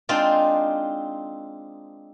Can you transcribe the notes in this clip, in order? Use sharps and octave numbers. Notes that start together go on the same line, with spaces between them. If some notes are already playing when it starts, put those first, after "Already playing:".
G#3 C4 D4 D#4 F4 D5